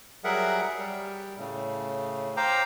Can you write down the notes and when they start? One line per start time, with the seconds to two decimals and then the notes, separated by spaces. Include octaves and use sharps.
0.24 F#3 G3 G#4 A#4 E5 F#5
0.77 G3
1.38 A2 C#3
2.37 C5 F5 G5 A#5 D6